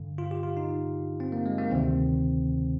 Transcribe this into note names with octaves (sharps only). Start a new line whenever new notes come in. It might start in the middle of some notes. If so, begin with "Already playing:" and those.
Already playing: G2 D3
F4
G4
F4
D#4
C4
A#3
G#3
A#3
D2 C3 D#3 C4